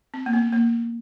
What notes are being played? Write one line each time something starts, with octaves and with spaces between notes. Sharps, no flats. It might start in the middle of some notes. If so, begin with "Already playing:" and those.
C4
A#3
B3
A#3